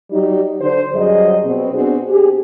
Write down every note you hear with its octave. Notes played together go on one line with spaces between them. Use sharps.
F#3 G3 D#4 G4
D3 D4 C5
F#2 F#3 G3 G#4 D#5
B2 C4
B3 C4 D4 F#4 G#4
G4 G#4